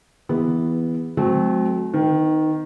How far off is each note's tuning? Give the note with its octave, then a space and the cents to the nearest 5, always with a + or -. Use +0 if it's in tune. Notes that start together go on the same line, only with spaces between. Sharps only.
E3 +0 B3 +0 G#4 -35
F#3 -15 A3 -45 C4 +0
D#3 +0 B3 +45